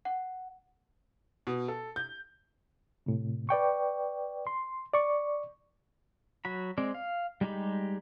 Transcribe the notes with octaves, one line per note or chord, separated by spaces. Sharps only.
F#5
B2
A4
G6
A2 C3
B4 D5 G5 C#6
C6
D5 C#6
F#3 F#4 B5
G#3 C4 D5
F5
G3 G#3 D#4 G4 B5